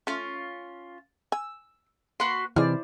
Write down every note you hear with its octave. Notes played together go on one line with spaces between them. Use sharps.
A3 C#4 F4
G#5 E6
A#3 F#4 B4 C6
C3 E3 D#4 E4 G#4 C5 D5 F6